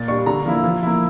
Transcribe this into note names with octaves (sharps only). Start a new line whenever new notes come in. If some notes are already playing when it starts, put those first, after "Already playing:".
Already playing: A#2 A6
G3 D4 C#6
D3 A#5
F3 A#3 E4
F3
A#3 E4